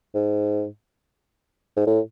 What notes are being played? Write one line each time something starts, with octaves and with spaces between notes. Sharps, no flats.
G#2
G#2
A2